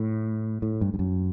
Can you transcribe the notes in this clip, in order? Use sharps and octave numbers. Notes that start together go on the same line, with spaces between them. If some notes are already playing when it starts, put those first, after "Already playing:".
Already playing: A2
A2
G2
G2
F#2